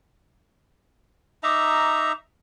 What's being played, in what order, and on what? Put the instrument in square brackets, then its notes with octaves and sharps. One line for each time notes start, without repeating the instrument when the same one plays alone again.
[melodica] D#4 E5 A#5 [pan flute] D6